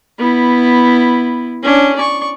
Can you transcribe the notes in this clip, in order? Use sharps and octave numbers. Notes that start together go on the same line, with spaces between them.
B3 E4
C#4 D4
D5 C#6